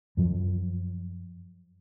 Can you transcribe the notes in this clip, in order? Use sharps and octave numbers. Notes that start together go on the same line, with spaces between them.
F#2 F3